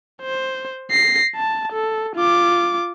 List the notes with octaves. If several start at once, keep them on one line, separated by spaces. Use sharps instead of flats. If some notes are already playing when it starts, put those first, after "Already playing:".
C5
A#6 C7
A5
A4
F4 D6